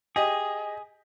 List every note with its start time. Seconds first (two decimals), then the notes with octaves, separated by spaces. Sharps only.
0.16 G4 G#4 D#5